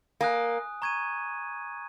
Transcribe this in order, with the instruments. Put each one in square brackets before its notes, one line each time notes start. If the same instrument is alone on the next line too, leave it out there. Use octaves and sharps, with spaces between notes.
[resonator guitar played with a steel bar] A#3 [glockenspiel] G#5 D#6 F#6
[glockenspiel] A#5 C#6 G#6 D#7